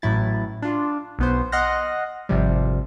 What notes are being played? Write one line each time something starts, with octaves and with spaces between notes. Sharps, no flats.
A1 A2 F#3 E4 A6
D4 F4
B1 B3 C5
D#5 F#5 C6 F6 F#6 A#6
G#1 C3 F3 G3